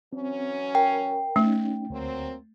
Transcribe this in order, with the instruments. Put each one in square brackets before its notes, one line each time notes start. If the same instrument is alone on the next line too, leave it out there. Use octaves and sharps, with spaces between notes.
[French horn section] E3 F#3 C#4 [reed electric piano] C4
[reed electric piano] A#4 [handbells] G5
[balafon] A3 [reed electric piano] C#4 D#4
[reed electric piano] D2 [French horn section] F#3 A#3 C4